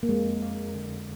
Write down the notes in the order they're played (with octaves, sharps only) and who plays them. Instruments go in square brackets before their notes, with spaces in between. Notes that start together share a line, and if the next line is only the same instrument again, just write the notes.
[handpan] A#3
[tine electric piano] F2 [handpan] G#3
[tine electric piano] A#3
D3